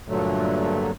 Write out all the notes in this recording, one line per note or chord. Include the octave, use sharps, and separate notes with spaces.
G2 A#2 D3 F#3 A3